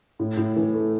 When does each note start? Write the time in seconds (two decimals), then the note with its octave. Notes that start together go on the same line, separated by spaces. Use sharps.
0.19 A2
0.37 A2
0.56 E3
0.74 A3